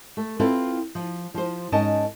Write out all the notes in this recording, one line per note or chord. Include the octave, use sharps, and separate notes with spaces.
A3
C4 E4 F4 A4 B4
F3
F3 C5
G#2 C#4 D#4 A#4 D#5 A5